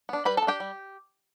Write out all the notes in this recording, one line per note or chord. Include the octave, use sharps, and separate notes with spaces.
B3 D4
G3 B4 B5
B3 A4 A5
D4 G4 G5
G3